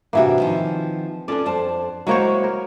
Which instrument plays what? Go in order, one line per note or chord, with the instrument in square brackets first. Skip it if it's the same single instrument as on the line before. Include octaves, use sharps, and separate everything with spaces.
[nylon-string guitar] A2 D4 F#4 [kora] C3 E3 A#3
[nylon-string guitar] D#3 F3
[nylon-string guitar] C#4 F4 A4 [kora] D4 D5
[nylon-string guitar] F2 C5 A5
[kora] F#3 A#3 C#5 [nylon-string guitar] G#3 E4 C5
[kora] A#4